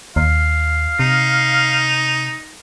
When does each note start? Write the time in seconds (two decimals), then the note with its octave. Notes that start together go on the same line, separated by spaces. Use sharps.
0.16 D#2 F5
0.99 C3 D#4